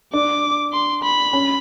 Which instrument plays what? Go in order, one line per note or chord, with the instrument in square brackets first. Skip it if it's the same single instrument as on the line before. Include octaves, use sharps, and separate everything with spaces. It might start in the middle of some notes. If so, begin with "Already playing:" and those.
[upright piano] D4 [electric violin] D6
[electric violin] C6
B5
[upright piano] C#4